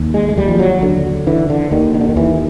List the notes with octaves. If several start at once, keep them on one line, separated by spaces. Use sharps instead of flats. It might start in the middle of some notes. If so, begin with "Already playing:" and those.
Already playing: D#2
G#3
G#3
D#2 G3
F3
F#3
D3 F#3
D3 E3
D3
D#2 D#3
D#3
D3
D#3
D#2 E3